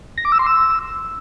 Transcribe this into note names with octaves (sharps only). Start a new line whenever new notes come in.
A#6
D6
E6
C6
E6